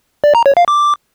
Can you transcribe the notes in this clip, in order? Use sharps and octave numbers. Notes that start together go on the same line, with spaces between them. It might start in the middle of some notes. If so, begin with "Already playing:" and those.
D5
A#5
C#5
F5
D6